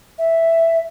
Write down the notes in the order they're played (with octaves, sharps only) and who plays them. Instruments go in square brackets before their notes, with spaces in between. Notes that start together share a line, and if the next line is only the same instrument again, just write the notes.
[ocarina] E5